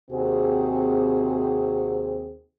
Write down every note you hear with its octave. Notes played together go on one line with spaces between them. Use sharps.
D#2 C3 C4 F#4 G#4